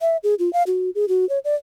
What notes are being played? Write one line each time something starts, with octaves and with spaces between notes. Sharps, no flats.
E5
G#4
F4
F5
F#4
G#4
F#4
C#5
D5